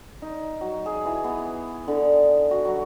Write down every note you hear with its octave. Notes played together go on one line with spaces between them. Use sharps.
D#4
F#3
G#4
E3
B3
D3
F#4
F#3